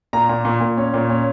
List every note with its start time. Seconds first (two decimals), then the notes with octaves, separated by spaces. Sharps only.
0.13 A#2 A#5
0.29 A#2
0.45 A#2
0.61 A#2
0.77 C#4
0.94 A#2
1.09 C#4